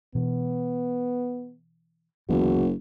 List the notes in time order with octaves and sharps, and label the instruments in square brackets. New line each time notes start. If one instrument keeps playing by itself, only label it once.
[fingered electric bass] B2 E3 [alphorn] B3
[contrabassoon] F#1 [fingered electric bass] D2 E3 B3 [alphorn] F#4